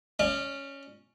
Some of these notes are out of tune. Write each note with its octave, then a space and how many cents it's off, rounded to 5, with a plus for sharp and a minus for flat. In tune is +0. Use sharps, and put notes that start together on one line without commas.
C#4 +0 D5 +40